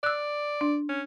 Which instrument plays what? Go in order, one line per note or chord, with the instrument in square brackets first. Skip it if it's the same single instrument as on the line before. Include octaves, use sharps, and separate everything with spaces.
[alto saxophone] D5 [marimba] E6 F#6
[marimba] D4
[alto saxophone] C#4